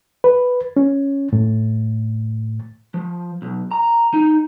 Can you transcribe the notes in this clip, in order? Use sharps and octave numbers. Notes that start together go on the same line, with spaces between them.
B4
C#4
A2
F3
B1
A#5
D#4